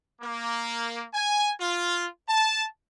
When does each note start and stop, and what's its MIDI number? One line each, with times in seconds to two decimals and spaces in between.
0.22 1.03 58
1.13 1.51 80
1.60 2.05 65
2.29 2.64 81